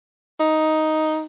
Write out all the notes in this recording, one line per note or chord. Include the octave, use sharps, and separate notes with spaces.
D#4